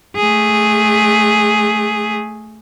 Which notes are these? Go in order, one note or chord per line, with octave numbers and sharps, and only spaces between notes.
A3 G#4